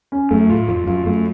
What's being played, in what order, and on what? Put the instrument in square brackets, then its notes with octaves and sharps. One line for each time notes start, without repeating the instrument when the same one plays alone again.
[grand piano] C#4
[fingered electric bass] F#2 [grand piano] A3
[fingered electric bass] A2 [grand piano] F4
[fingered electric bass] F2 [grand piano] F4
[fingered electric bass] F#2 [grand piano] F4
[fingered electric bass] F#2 [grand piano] A3